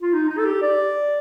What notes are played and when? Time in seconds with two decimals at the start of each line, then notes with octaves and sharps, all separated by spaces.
0.02 F4
0.13 D#4
0.29 D#4
0.38 A4
0.45 G4
0.62 D5